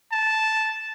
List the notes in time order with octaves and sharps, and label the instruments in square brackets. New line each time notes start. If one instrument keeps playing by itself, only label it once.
[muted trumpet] A5